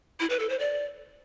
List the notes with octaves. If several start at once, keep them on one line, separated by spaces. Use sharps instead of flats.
E4
B4
A4
C5
D5